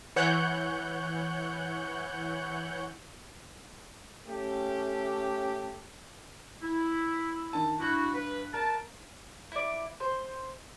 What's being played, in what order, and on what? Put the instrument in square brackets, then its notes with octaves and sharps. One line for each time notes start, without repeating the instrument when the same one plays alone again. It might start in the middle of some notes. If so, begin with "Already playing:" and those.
[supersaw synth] E3 C#5 F#5 F#6 G6
[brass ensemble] A3 C#4 G4
[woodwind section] E4
[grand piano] D#3 A5
[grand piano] G2 F#6 [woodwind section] E4 F#4
[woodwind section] B4
[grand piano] A#4 [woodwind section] A5
[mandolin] E4 D5
C5